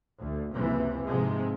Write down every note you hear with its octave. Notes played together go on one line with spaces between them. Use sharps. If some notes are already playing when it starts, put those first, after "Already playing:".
D2
F#1 C#2 C3 E3
G#2 C3 F3 G#3